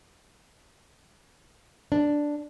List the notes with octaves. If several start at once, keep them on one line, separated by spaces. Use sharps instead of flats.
D4